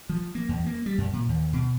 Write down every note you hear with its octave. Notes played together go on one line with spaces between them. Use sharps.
F3
A#3
E2
A#3
G3
F#2
A#2
D#2
B2